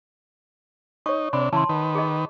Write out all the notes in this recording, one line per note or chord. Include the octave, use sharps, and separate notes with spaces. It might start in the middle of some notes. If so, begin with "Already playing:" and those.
D#4 C#5 C#6
C3 D4 B5
C#3 E3 A5 C6
D#3 B4
G#4 D#5